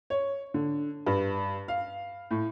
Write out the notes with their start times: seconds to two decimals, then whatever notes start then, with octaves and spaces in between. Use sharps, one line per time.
0.10 C#5
0.54 D3
1.07 G2
1.68 F5
2.31 A2